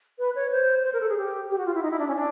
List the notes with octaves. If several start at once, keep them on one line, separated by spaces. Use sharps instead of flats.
B4
C#5
C5
C5
A#4
A4
G#4
G4
G4
F#4
F4
E4
D#4
E4
D4
C#4
D4